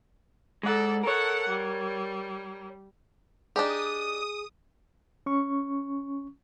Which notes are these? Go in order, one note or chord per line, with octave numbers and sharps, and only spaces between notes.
G#3 A4 D5 F#5
A4 A#4 C#5 F#5
G3
D4 D#4 G4 G#4 D#6
C#4 C#6